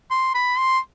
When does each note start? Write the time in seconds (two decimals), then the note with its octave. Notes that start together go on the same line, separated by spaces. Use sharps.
0.11 C6
0.35 B5
0.58 C6